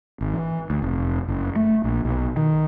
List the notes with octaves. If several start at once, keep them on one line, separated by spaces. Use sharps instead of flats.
G#1
E3
D2
F1
F#1
A3
A#1
B1
D#3